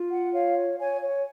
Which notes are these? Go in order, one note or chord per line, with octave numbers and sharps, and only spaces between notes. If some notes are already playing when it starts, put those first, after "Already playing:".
Already playing: F4
F#5
C#5 F5
C#5 G#5
C#5